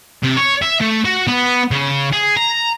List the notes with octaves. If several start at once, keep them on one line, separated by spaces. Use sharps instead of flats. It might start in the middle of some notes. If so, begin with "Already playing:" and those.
C3
C#5
E5
A3
F#4
B3
C#3
G#4
A#5